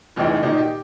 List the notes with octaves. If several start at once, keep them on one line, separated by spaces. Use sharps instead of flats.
F1 C#2 E3 D#4 G5
A#2 D#3 D#4
G4